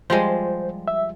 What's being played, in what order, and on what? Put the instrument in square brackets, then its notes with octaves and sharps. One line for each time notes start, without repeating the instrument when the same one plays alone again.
[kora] F3 G3 G#3 [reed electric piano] C5
[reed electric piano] E5